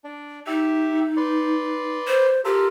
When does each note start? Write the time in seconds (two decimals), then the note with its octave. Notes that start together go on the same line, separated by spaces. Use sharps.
0.04 D4
0.47 D#4 G4 E5
1.17 B4 D5 C6
2.07 C5
2.45 F4 G4 A4 A#4